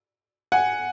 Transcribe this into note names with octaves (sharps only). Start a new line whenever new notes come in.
F#5 G#5